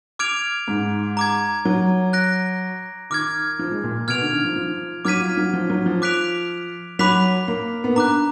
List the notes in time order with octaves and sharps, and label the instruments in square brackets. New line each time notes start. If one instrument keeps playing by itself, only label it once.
[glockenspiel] D6 F6 G#6 D7 F7
[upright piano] G#2
[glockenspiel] A#5 D6 G#6
[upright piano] F#3
[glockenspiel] F#6 A#6 D7
[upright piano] D#3 [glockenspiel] D6 F6 G#6
[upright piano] F3
G#3
A#2
[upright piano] B2 [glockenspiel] F6 G#6 D7 F7
[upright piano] D3
D#3
F3
F3
[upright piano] F#3 [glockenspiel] D6 F6 G#6 B6 D#7
[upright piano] F4
F#3
F3
F#3
F3
[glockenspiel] D6 F#6 B6 D7 F7
[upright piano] F#3 [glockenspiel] B5 D6 F#6 B6 F7
[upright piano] A#3
B3
[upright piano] D4 [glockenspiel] A#5 D6 F#6